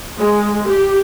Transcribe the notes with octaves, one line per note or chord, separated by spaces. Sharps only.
G#3
G4